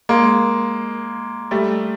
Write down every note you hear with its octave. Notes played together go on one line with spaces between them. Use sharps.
G#3 A#3
G3 A3